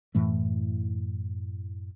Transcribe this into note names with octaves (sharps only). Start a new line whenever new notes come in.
F#2 A2 E3 A3